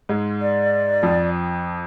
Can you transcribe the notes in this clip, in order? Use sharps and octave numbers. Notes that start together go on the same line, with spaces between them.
G#2 G#3
D5
F2 F3